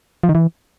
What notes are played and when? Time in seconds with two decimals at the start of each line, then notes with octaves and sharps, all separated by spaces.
0.23 F3
0.29 D#3
0.35 E3